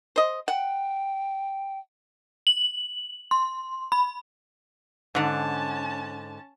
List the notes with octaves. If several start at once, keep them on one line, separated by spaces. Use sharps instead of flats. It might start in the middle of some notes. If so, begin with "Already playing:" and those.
C5 D#5
F#5 G5
F#7
C6
B5
G#2 D3 C#4 A5